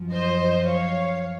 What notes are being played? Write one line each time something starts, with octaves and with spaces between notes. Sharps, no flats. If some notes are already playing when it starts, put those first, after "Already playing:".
Already playing: F#2 F3
C5 D#5
C#5 F5